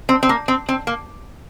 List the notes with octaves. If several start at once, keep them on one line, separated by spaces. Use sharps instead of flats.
C4
C4
A#3
C4
C4
A#3